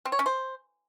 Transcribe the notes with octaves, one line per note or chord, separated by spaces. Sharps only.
C4
C#5
C#4
C5